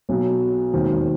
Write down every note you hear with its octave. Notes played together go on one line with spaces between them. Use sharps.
B1 B2 F#3
E1 D#2 D#3 F#3 C4